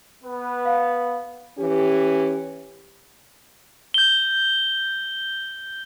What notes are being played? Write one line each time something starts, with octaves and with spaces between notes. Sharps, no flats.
B3 B4
F5
E3 C#4 G4
G6 G7